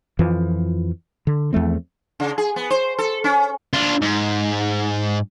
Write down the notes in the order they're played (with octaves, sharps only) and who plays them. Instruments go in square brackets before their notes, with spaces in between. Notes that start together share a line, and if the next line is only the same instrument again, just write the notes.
[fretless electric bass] F2 E3 F3
D3
E2 F3 A3 C4
[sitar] C#3
G#4
B3
C5
A4
C#4
[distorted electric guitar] D4 F4
G#2